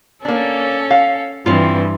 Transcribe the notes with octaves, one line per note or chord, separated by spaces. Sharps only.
A#3 C#4 D4 A4
F5
G2 E3 C4 F4